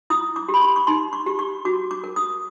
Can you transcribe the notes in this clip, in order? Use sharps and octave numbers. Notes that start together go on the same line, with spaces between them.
E4 D#6
D6
G4
B5
C6
C#6
D#4 C6
C#6
G4
C#6
F#4 D6
D6
A#4
D#6